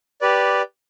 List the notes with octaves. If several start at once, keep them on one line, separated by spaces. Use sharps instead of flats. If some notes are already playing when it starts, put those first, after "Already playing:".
G4 B4 D5